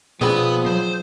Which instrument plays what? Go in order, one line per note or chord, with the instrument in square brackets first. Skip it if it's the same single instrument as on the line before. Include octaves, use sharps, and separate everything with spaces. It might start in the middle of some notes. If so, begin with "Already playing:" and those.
[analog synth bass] B2 [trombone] F3 [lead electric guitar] B3 B5 [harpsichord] C4 D4 G#4
[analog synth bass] F#3 [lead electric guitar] C5